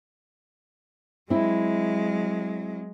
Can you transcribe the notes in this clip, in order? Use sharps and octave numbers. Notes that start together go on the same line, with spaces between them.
F#3 G#3 C4 E4